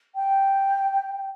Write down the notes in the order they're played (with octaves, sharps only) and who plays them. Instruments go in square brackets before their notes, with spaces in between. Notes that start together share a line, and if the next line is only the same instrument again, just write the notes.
[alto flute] G5